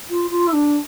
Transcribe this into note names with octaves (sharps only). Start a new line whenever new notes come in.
F4
F4
E4
D4